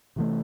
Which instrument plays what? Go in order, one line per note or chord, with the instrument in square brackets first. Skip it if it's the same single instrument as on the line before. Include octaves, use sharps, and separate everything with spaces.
[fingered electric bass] C3 E3 A3